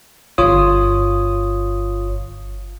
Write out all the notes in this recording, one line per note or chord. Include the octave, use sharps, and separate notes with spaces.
G1 F4 C#5 D#6